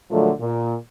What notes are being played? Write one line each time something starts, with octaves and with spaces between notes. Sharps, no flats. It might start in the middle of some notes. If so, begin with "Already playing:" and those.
A#2 D3 F3 F#3 G#3 A3
A#2